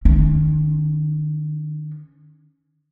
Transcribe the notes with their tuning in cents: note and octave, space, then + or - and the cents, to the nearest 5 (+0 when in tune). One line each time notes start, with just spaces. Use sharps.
D#3 -40 C#4 +0